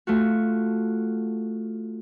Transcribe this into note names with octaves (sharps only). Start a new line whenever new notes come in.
A3 F4 F#4